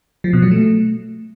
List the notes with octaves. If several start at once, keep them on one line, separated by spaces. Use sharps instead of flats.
F3
B2
F#3
A3